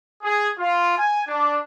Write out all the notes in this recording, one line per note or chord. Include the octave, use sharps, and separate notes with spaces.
G#4
F4
G#5
D4